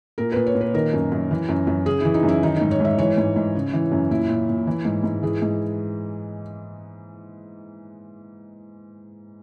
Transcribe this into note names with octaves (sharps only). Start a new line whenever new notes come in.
A#2 A#4
A#2 B4
C#5
A#2
B4
D#3 A#4
F#2
F#2
E3
F#2
F#2
C#3 G#4
E3 E4
D#4
F#2
E4
D#3 D#4
G#2 D#4
C#5
G#2 E5
E3 C#5
G#2
G#2
C#3
E3
F#2
A#2 E4
A#2
A#2
E3
G#2
G#2
E3 G#4
G#2